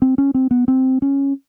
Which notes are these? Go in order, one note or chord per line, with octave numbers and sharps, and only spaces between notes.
C4
C#4
C4
B3
C4
C#4